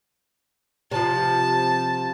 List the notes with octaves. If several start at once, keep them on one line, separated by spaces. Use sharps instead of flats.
C3 F3 A5